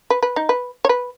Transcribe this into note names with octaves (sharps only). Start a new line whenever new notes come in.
B4
B4
D#4
B4
C#5
B4